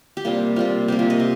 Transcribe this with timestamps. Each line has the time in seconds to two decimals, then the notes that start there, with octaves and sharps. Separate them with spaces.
0.17 G4
0.25 C3 G3 A#3 F4
0.56 C3 G3 A#3 F4
0.88 C3 G3 A#3 G4
0.99 F4
1.10 D#5
1.20 C3